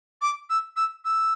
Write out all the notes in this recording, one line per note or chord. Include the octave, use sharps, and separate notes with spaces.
D6
E6
E6
E6